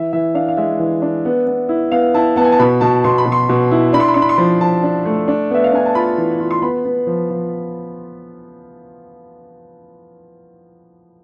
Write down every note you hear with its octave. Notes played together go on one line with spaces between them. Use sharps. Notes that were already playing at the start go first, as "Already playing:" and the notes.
Already playing: E3 E5
E3 E5
D4 F5
F5
G#3 E5
E3
D4
B3
B3
E4
B3 F5
E4 A5
B3 A5
G#5
A5
B2 B5
B2 A5
B2 C6
B5
B2
C6
B2
E4
D4 B5
C6
B5
D4 C6
B5
C6
F3 B5
F3 A5
D4
A3
D4
B3 E5
F5
D4 G#5
A5
F4 B5
E3
F4
C6
B3 B5
B3
F3
F3